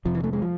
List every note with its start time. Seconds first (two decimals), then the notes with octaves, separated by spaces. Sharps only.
0.05 F1 F2 C3 F3
0.15 E3
0.24 A3
0.33 G#3
0.42 F3